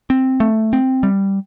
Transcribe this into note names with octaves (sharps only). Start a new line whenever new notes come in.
C4
A3
C4
G3